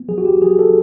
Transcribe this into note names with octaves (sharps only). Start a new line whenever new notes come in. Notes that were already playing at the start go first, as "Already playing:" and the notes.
Already playing: B3
F#3 G#4
F#4
G4
F#3 G#4
A4